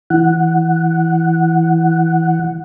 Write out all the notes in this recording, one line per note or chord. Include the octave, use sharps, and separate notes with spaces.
E3 F#5